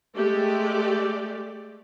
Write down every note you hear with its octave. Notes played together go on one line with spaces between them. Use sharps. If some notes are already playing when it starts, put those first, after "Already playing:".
G#3 A3 G4 D5